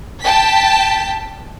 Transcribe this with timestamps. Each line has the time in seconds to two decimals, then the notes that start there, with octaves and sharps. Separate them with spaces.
0.22 G5 A5 B6